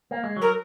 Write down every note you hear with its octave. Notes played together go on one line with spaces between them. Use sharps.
A#3
G#3
F#3 A#4